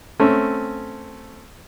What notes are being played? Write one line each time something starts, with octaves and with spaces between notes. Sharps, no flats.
A3 C4 C#4